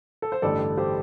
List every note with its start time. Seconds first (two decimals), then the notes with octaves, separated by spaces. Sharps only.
0.22 A4
0.32 C5
0.42 A1 G2 D3 G3 A4 D5
0.59 A4
0.77 G4 C5